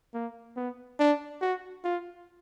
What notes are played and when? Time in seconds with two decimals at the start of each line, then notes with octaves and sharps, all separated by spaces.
0.14 A#3
0.56 B3
0.99 D4
1.42 F#4
1.84 F4